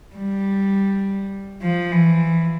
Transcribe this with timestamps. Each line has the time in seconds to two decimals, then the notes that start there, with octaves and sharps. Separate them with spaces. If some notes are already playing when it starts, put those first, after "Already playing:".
0.16 G3
1.62 F3
1.91 E3